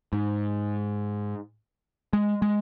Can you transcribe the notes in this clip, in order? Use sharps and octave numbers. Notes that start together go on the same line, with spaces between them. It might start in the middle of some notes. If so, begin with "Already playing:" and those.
G#2
G#3
G#3